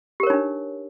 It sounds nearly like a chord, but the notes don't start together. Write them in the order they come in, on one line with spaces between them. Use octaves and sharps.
G4 A#4 C#5 D#4 D4